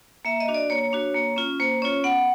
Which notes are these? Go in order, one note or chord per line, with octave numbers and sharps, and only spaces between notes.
A#3 E5
D#5
D4 F#4
D5
A#3 C#5
D4 F#4
A#3
C#4 F4
A#3 C5
C#4 F4 C#5
B3 F#5